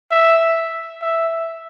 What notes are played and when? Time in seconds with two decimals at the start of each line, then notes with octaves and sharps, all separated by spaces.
0.12 E5
1.02 E5